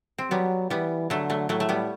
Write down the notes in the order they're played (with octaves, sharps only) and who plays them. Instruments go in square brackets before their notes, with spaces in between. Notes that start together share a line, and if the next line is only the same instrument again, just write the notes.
[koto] C4
[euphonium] F#3 [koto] G3 B3
[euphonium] E3 [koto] G3 B3
[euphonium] D3 [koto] F#3 A3
[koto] F#3 A3
[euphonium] A2 [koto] F#3 A3
[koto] A3
G3 B3